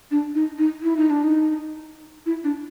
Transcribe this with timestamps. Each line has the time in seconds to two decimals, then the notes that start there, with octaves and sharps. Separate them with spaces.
0.11 D4
0.35 D#4
0.58 D#4
0.83 E4
0.97 D#4
1.10 D4
1.24 D#4
2.26 E4
2.44 D4